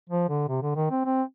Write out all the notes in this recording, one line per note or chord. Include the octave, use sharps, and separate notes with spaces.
F3
D3
C3
D3
D#3
C4
C4